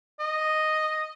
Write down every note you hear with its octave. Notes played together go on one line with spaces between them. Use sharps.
D#5